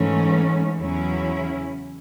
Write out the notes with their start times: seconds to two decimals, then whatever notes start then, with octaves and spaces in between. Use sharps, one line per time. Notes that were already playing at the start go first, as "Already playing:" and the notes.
Already playing: G#2 E3 A3 C#4
0.76 E2 C#3 F#3 C#4 E4